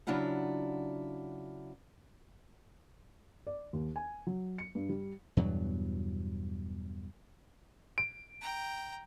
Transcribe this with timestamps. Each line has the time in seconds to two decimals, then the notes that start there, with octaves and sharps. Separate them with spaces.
0.07 C#3 F#3 D4 E4 F4 F#5
3.47 D5
3.73 D#2
3.96 G#5
4.27 F#3
4.58 C#7
4.75 G2
4.89 G3
5.37 E2 G2 B2 F#3
7.98 D7
8.41 G5 A#5